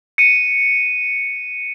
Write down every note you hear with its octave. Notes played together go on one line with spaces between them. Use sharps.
C#7 D#7